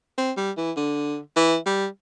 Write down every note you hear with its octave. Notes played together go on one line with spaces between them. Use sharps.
C4
G3
E3
D3
E3
G3